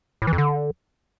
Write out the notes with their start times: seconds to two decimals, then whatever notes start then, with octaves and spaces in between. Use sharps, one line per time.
0.22 A2
0.27 E3
0.33 F2
0.38 D3